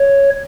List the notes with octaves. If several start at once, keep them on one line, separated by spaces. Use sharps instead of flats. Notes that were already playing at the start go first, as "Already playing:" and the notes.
Already playing: C#5